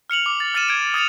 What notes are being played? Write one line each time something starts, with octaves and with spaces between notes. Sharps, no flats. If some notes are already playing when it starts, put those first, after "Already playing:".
F6 C#7 F7 F#7
D6
A6
F6 A6 C#7 D#7 E7
G#6 D7
D#6 A6 C#7 F7